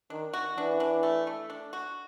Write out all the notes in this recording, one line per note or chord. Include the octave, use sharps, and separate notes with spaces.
D#3 D4
F#4
E3 D4
D4
A3
A3
D4
F#4